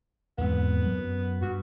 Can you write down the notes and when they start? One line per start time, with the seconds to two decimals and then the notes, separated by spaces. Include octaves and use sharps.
0.38 E2 G#2 B3 C4
0.85 F#2 F#3
1.42 G2 F#4